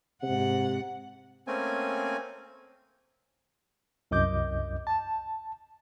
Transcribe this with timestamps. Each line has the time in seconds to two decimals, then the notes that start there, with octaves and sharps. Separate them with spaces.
0.23 G#2 C3 F#5
1.47 A3 A#3 C4 C#4 G#5
4.11 C2 F#2 D#5 D6 G6
4.87 A5